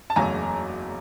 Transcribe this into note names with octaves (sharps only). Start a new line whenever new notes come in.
A5
F#1 E2 C#3 F#3 A3 G#5 A#5